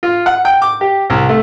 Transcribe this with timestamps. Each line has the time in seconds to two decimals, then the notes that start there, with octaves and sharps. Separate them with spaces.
0.03 F4
0.26 F#5
0.45 G5
0.62 D6
0.81 G4
1.10 C2
1.29 A3